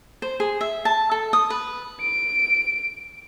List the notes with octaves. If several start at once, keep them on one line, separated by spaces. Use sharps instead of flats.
C5
G#4
E5
A5
A4
D#6
B4
D7